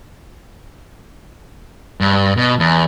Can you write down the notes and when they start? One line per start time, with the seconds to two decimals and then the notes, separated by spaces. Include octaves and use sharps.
2.01 G2
2.37 B2
2.59 E2